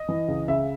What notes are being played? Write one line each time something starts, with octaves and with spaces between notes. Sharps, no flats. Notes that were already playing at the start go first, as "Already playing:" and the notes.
Already playing: D#5
E3
C#2
C#3 E5